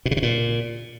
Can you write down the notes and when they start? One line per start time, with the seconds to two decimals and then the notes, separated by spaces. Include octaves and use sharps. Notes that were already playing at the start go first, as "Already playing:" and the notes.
0.05 B2
0.11 C#3
0.17 C3
0.22 A#2